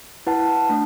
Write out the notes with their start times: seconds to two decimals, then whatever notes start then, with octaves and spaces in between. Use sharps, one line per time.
0.27 E4 B4 F#5 A5
0.69 A3 D4